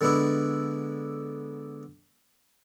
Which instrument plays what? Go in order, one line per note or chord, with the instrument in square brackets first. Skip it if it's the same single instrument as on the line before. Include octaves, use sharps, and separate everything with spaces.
[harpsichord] D3 G#3 B3 D4 E4